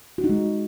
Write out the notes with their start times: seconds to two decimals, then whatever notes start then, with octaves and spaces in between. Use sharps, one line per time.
0.18 F#4
0.24 D#4
0.30 G#3